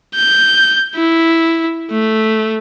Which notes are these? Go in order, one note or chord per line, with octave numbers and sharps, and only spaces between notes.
G6
E4
A3